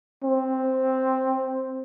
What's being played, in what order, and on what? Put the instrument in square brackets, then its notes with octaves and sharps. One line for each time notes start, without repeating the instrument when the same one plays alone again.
[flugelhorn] C4